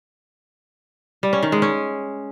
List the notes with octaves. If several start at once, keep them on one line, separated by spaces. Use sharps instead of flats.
G3
C#4
D#3
G#3
C#4